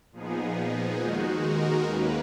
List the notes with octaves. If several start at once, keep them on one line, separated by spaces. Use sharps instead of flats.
A#2 F3 B3 D#4 G#4
D#2 D#3 G#3 D#4 F#4
A#4
D#2 D#3 A#3 C#4 B4